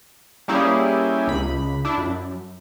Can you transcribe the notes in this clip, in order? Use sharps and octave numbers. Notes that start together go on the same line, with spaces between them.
G3 A#3 C#4 E4 G4 G#4
C#2 B5
D4 E4
F#2